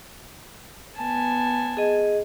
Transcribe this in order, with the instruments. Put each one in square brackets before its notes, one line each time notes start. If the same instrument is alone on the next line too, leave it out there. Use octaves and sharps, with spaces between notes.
[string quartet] B3 G#5 A5
[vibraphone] G#4 D#5